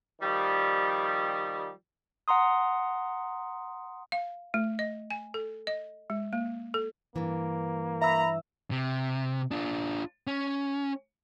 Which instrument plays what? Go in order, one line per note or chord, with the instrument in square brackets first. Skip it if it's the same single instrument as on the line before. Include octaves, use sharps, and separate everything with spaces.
[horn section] D#3 F3 G3
[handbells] F#5 A#5 C6 D#6
[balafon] F5
A3
D#5
G#5
A4
D#5
G#3
A#3
A4
[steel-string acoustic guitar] G2 E3 [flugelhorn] A#3
[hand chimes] E5 E6 [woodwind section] A#5 B5
[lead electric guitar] C3
D4 F4
C#4